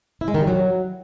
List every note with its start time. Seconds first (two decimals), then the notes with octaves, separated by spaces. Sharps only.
0.21 E4
0.28 G#3
0.34 D#3
0.41 G3
0.48 F#3